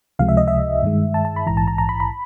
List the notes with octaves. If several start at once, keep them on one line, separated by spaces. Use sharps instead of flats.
C#2 C3 F3 G#3 F5
E5
D#5
E5
G2 D#3 G#3
A5
A5
B5
A#1 G#2 E3 A#5
A5
A#5
A#5
B5
B5